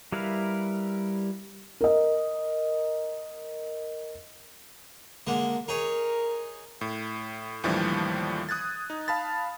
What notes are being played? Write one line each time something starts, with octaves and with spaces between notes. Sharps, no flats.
G3 E4 A#4 B4 F5
A#4 D#5
D3 G#3 A#3
D#4 G#4 A#4 C#5
A2
D#2 A2 E3 F3 G3 D4
D#6 F#6 G#6 A6
D#4
F5 A5 B5 A6